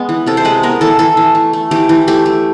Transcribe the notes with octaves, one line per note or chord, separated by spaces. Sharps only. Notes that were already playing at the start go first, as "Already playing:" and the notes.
Already playing: G#3 B3
E3
C3 A4
C5
G#3 B4
B3 A#4
E3 A4
E3 A4
E3
A3
A3
E3 G4
E3
A3 G4
A3